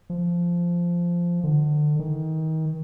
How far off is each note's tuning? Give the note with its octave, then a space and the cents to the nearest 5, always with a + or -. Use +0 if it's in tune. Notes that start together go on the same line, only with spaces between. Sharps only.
F3 -10
D3 +30
D#3 +30